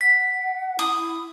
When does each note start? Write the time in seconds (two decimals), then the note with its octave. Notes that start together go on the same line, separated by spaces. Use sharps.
0.01 F#5 B6
0.79 E4 D#6